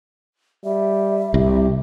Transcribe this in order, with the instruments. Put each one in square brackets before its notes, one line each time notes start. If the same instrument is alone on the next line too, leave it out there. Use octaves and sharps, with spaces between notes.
[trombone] G3 [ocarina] E5
[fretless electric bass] C2 [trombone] G4